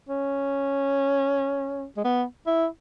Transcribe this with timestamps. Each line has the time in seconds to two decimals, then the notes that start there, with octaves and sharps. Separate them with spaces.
0.09 C#4
1.97 G#3
2.04 B3
2.47 E4